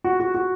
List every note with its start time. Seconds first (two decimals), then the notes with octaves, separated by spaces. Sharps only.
0.04 F#4
0.20 F#4
0.34 F#4